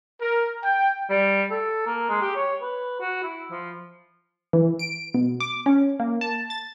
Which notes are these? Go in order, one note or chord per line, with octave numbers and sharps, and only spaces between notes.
A#4
G5
G3
A4
A#3
G#3
G4
C#5
B4
F#4
E4
F3
E3
D7
B2
D6
C#4
A#3
A5
A6